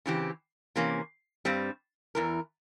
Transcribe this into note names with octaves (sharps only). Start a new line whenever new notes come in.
C#3 E3 C4 G4
C3 E3 A#3 C#4
G2 G3 C4
E2 E3 A#4